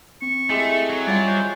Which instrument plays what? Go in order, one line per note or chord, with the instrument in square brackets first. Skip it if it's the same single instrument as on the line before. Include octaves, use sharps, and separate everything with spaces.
[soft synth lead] C4 [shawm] C#6
[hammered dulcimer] G#3 E4 G4 [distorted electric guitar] A3
[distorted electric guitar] F#3
[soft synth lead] G3 [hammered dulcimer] F4 F#5 [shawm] D5
[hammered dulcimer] G4 [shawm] C5